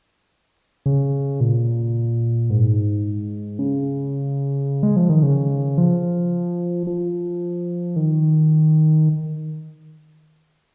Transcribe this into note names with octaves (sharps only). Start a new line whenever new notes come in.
C#3
A#2
G#2
C#3
G#3
F3
D#3
C#3
F3
F3
D#3